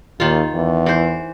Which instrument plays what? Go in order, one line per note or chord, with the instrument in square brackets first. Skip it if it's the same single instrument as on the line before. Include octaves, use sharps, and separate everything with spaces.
[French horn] D#2 [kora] D#3 F4
[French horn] E2
[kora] E3 C5